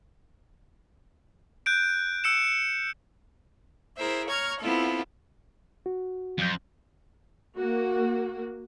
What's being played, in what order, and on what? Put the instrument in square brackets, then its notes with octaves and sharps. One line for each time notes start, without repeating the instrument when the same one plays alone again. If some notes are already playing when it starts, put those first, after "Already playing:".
[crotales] F#6 G6 D7
E6 C#7 E7
C#7
[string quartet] E4 G#4 A#4 C5 E5
C#5 A#5 C#6 F6 G#6
B3 C4 E4 F4 A4
[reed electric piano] F#4
[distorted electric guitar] F2 [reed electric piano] F#3 G6
[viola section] A#3 F#4